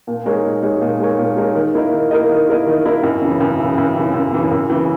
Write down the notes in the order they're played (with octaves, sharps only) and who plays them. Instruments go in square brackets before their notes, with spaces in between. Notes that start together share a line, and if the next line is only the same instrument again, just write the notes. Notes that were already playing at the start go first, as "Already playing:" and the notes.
[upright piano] A#2
G#3 D#4 A#4 C#5
A#2
G#3 D#4 A#4 C#5
A#2
G#3 D#4 A#4 C#5
A#2
G#3 D#4 A#4 C#5
D#3
A#3 E4 A#4 D#5
D#3
A#3 E4 A#4 D#5
D#3
A#3 E4 A#4 D#5
D#3
A#3 E4 A#4 D#5
F#2
C#3 E3
F#2
C#3 E3
F#2
C#3 E3
F#2
C#3 E3
F#2
C#3 E3